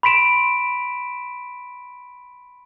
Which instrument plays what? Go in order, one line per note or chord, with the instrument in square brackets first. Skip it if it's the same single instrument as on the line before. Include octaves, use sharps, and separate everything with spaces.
[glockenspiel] B5 C6 B6 D7 E7